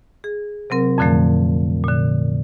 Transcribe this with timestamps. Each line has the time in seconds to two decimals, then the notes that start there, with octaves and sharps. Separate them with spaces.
0.24 G#4
0.70 C3 F#3 C4 A#4
0.98 F2 A#2 D3 F3 A3
1.84 A#2 D3